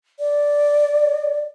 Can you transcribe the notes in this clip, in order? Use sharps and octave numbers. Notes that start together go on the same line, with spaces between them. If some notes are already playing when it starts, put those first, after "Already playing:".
D5